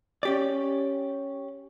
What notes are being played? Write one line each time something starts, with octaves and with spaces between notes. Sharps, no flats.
C#4 G4 D5